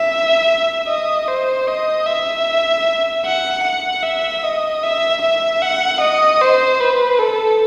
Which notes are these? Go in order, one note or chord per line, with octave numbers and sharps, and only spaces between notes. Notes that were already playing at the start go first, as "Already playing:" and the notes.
Already playing: E5
D#5
C5
D#5
E5
F#5
F#5
E5
D#5
E5
E5
F#5
D#5
C5
B4
A4